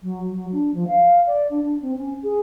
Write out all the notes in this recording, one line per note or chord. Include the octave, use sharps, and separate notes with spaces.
F#3
F#3
D4
F3
F5
D5
D4
D4
C4
C#4
G#4